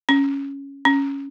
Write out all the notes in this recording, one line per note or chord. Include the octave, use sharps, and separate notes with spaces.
C#4
C#4